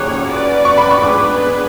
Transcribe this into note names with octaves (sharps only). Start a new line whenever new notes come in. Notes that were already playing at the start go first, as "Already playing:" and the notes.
Already playing: G#4 C#5 D6 F#6
C#4 F#4 B4 D5
C#6
B5
C#6
G#3 B3 D4 G#4 B4 D6